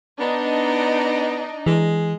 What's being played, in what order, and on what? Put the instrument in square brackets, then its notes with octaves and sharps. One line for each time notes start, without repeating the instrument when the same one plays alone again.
[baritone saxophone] B3 [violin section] D4 D#4 D#5
[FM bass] E3 [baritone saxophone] G#3